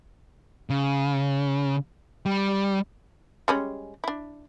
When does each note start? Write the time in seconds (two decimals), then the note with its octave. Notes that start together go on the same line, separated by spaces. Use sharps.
0.70 C#3
2.26 G3
3.48 G3 G#3 C#4
4.04 D4 E4